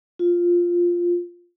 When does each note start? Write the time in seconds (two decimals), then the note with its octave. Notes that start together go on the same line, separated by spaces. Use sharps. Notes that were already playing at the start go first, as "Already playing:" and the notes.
0.19 F4